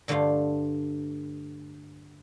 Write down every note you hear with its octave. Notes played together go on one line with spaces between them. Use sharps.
G2 D3 A3 F4 F5